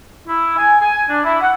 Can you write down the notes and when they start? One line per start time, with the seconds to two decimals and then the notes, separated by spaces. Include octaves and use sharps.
0.27 E4
0.58 G#5
0.82 G#5
1.10 D4
1.24 E4
1.41 F#5